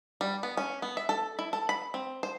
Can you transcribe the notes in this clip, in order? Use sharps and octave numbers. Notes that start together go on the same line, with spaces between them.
G3
B3
C#4
B3
E5
A4
E4
A4
B5
C4
C5